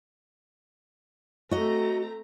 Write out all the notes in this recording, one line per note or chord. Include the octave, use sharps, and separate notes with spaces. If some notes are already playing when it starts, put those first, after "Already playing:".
A3 C4 F#4 D#5 A#5